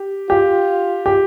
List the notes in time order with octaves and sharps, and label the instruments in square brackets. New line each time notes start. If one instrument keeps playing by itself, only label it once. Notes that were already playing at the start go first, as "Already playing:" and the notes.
Already playing: [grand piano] G4
[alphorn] F4 [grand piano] G4
[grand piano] G4